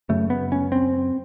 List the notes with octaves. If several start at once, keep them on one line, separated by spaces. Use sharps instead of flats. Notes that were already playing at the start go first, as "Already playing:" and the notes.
F#2 C#3 A3
B3
C#4
C4